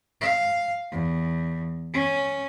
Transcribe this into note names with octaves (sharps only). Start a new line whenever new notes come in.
F5
E2
C#4